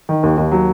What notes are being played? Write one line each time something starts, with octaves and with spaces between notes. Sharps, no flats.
D#3
D#2
D#2
F#3